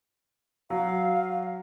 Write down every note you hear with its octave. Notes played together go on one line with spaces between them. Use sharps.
F#3 F5